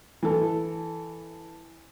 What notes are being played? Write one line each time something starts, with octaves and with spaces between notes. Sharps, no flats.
E3 A4